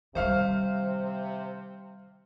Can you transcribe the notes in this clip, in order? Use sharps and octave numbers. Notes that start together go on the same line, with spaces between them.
C3 D#3 G3 C5 E5 F5 F6